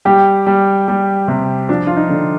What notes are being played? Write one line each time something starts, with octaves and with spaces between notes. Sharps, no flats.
G3 G4
G3
G3
C3
F3 D4
F4
D#4
D3